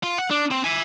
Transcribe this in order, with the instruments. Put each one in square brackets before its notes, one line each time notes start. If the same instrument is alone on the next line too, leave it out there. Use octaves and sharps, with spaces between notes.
[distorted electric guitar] F4
F#5
D4
C4
E5 G#5